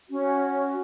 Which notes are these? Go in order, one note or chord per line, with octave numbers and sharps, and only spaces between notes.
C#4 F#4